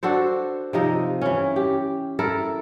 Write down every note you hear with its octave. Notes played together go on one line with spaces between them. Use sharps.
D4 F#4 A4 C5
C3 F3 D#4 D#5
E3 C#4
G4
E4 A4 A#4